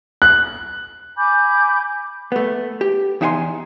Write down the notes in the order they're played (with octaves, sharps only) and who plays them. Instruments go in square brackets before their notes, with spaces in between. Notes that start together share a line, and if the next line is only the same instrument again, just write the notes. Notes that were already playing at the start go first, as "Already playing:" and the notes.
[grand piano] F#6
[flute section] G#5 B5 D6 G6
[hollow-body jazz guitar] A3 B3
G4
E2 D#4 E5 F#5 G#5 C6